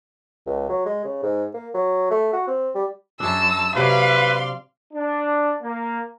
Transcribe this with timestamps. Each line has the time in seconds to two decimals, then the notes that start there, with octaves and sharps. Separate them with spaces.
0.46 C#2
0.69 F#3
0.85 G#3
1.05 C#3
1.23 G#2
1.54 A#3
1.74 F#3
2.11 A3
2.33 F#4
2.47 C4
2.75 G3
3.20 F#2 D4 G#4 A5 E6
3.76 C3 F#3 B4 D5 F5 C6
4.94 D4
5.63 A#3